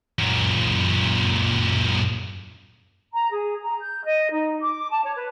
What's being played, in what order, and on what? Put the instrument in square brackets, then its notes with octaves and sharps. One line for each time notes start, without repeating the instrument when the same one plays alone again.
[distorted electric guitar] F#2 A#2
[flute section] A#5
G#4
A#5
G6
D#5
D#4
D6
A5
C#5
B4